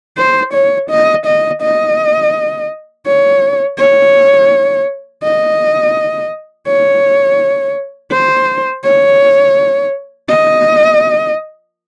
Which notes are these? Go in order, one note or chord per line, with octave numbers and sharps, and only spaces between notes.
C5
C#5
D#5
D#5
D#5
C#5
C#5
D#5
C#5
C5
C#5
D#5